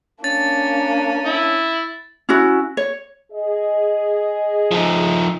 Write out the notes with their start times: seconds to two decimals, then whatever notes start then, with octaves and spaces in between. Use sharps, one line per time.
0.24 A#3 C#4 D4 A6
1.25 E4
2.29 C#4 E4 F#4
2.77 C#5
3.32 G#4 D#5
4.71 F3 D#4